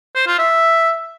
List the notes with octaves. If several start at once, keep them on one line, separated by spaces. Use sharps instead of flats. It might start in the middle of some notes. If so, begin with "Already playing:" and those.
C5
F4
E5